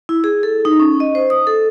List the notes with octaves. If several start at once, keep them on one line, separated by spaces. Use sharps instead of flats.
E4
G#4
A4
D#4
C#4
D#5
C5
D#6
A4